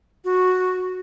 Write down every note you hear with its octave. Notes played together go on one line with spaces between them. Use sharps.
F#4